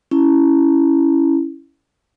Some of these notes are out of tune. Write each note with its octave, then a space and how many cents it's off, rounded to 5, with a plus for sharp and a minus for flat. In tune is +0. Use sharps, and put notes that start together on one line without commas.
C#4 +0 E4 +0